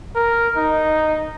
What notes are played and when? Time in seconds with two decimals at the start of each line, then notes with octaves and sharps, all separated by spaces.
0.16 A#4
0.57 D#4